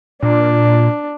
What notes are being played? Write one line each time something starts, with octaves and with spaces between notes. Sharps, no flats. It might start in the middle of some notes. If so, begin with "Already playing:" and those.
A#2 D4